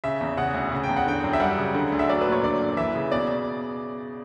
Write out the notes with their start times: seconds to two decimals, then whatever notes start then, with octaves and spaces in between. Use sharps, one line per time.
0.04 C#3 E5
0.21 E2
0.37 C#3 F#5
0.54 D2
0.72 C#3
0.84 E2 G5
0.96 F#5
1.07 D3 G5
1.24 F#2
1.33 E5
1.40 G3 F#5
1.58 C#3
1.74 D3
1.92 D2
1.99 E5
2.09 F#3 D5
2.21 B4
2.26 A#2
2.32 C#5
2.43 D3 D5
2.61 F#2
2.77 E3 E5
2.95 C#3
3.11 B2 D5